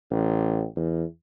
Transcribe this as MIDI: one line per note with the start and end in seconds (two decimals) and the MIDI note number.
0.11 0.64 33
0.76 1.04 40